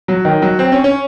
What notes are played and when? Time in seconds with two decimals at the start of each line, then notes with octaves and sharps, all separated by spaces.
0.08 F#3
0.25 D#3
0.42 F#3
0.59 C4
0.72 C#4
0.84 C#4